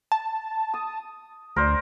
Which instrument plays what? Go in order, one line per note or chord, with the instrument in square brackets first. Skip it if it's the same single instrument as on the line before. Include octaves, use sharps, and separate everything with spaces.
[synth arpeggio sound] A5
[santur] D#6
[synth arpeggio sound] D2 [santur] A#4 C5 D5